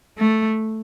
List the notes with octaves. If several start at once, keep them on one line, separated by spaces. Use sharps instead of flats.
A3